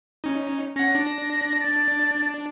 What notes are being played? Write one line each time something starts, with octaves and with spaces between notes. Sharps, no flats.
C#4 D#4
C#4 F#5 A#6
D4
A6